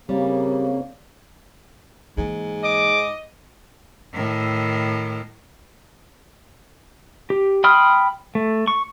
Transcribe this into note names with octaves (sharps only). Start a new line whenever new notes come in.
C#3 G3 A#3 C4 C#5
G#2 E3 A#3
D#5 D6
A2 D#3
G4
G5 B5 C6 D#6 F6
A3
C#6